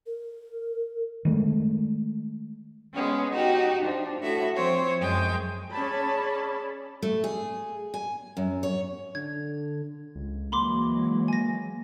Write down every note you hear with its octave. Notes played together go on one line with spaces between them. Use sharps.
A#4
D#3 G#3 A3
G#3 B3 C#4
D#4 F#4 G4
F3 D4
A2 F#4 E5
F3 C4 C5 C#5
F#2 G#3 G5
C#4 G#4 D5 A5 B5
A3
G#4
G#5
F#2
C#5
D3 G#6
C#2
E3 F#3 G#3 A#3 B5 C6 D6
G#5 A#6